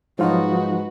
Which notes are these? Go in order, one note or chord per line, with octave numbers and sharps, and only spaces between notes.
G#2 F3 F#3 D#4 F4 F#4 B4